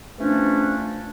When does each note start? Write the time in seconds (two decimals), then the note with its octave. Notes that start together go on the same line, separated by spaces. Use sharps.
0.18 E2 F3 A3 C#4 D4